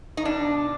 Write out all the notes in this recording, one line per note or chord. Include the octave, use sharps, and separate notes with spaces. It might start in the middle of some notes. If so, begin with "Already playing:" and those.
D#4
B2 D4